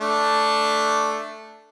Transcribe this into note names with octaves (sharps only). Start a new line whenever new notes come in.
A3 D4